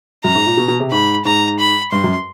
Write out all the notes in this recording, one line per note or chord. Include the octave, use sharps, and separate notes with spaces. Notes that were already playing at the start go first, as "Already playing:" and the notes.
F#2 A#5
G#2
A#2
B2
B2
C3
G#2 B5
G#2 A#5
B5
G2 C6
F#2